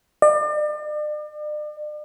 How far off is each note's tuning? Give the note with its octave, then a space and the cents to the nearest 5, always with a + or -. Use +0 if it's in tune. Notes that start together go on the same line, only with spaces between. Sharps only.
D5 +40